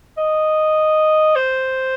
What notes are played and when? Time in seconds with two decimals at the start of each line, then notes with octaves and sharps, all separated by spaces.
0.18 D#5
1.36 C5